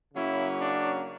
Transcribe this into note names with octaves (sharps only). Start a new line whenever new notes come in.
C#3 F#3 A#3 C#4 E4
D4